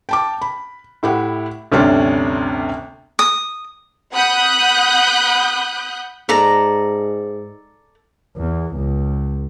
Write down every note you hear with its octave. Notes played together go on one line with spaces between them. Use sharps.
G5 A5 D6
B5
A2 E4 G4 F#5
G1 D2 C3 C#4 D4
D#6
F#5 B5 D#6 F#6 G6
G#2 A4 D5 A#5
E2
C#2